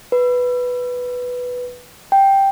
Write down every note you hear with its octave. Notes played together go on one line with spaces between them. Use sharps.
B4
G5